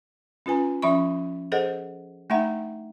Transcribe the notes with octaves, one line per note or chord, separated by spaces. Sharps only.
C#4 F4 B4 G#5 A#5
F3 C#4 E5 B5 C#6
G#4 A4 C5 D#5 F#5
A3 D4 D#4 E5 F#5 A#5